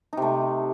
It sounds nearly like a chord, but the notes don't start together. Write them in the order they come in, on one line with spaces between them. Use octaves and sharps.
D#4 C3 A3